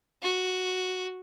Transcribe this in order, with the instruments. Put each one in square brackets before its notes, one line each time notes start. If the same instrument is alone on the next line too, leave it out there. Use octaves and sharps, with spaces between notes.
[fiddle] F#4